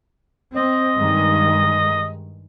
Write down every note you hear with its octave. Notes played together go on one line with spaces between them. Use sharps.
C4 D#5
G2 D#3 G#3